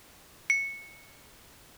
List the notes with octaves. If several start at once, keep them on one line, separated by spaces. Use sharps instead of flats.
C#7